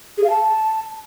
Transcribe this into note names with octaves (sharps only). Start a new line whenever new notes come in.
G#4
F5
A5